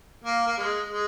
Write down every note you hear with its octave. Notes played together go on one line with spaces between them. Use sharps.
A#3
A#3
G#3
G#3